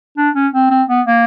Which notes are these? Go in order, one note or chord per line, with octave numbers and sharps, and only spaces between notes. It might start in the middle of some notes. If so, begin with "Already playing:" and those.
D4
C#4
C4
C4
B3
A#3